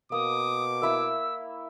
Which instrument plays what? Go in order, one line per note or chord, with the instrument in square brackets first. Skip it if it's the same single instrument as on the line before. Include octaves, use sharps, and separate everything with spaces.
[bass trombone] B2 [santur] A#3 [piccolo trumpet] D6 [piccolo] D#6
[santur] A#3 E4 E5 [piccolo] E6